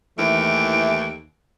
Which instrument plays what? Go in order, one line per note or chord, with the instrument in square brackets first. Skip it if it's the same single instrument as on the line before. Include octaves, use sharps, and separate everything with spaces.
[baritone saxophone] D#2 [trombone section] E3 [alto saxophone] A3 [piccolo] D7